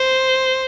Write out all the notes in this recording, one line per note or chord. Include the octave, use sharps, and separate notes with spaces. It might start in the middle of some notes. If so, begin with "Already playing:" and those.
Already playing: C5